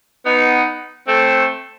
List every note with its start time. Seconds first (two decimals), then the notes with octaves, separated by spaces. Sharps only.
0.25 B3 D#4
1.07 A3 C4